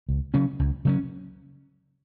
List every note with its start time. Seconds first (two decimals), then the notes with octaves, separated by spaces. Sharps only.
0.09 C#2
0.34 C#3 F#3 C#4
0.59 C#2
0.85 C#3 F#3 C#4